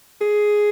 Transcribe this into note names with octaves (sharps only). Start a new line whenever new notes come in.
G#4